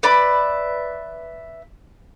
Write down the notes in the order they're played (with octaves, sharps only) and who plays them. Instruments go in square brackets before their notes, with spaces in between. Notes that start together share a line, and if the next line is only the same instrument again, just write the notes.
[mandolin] B4 D5 E5 B5